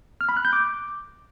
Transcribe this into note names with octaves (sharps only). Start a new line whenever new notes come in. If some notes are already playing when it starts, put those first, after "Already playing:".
F6
B5
F#6
G6
D6